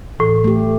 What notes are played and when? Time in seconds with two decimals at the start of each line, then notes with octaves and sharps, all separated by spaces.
0.19 A2 E3
0.44 A3 G4